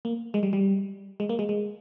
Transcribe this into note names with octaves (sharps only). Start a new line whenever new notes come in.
A#3
G#3
G3
G3
G#3
A#3
G#3
G#3